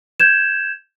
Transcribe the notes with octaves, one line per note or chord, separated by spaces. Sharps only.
G6 G#6 E7